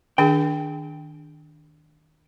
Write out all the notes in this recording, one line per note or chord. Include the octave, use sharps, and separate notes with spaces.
D#3 D4 G#4 G5